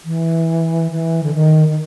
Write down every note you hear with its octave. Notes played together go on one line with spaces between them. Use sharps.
E3
E3
D3
D#3
D#3